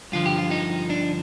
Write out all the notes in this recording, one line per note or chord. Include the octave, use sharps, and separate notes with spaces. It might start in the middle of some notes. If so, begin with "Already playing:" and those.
G2 D3 F3 F4
G4
F4
D#4
D4